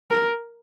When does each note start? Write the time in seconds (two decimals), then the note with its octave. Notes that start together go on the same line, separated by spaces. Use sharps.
0.11 A#4